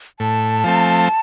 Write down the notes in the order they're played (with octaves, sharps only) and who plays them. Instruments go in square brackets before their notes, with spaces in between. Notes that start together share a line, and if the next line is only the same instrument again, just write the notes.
[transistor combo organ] A2 [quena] A5
[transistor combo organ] F3 A3 C4